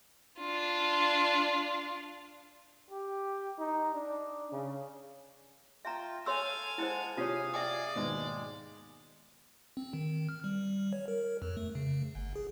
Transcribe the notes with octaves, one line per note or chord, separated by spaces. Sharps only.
D4 F4
G4
D#4
D4
C#3
F4 E5 G5 A#5
A4 C#5 F5 G#5 C6 E6
G#3 E4 C5 F#5 A5
C3 F4 G4 G#4 C#5 F5 G#5
D5 E5 G5 D#6
D#2 G#2 B2 G#3
C4
D#3
F6
G3
C#5
A#4
F2
A3
C#3
G1
G#4